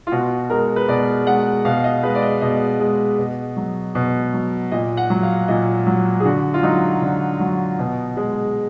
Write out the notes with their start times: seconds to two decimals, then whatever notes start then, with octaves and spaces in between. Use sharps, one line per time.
0.07 F4
0.12 B2 F#4
0.50 G#3 A#4
0.76 B4
0.88 B2 D5
1.26 G#3 F#5
1.65 B2 F5
1.84 D#5
2.03 G#3 B4
2.15 D5
2.23 D#5
2.41 B2 D#5
2.80 G#3
3.18 B2
3.57 F#3
3.95 B2
4.33 F#3
4.72 A#2 D#5
4.97 F#5
5.10 F#3
5.23 F5
5.48 A#2 D#5
5.87 F#3
6.20 G#4
6.25 D3 F#4
6.54 F4
6.63 F#3 D#4
7.02 D3
7.40 F#3
7.79 B2
8.17 G#3